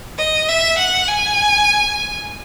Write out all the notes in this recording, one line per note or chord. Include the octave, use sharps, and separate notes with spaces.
D#5
E5
F#5
G#5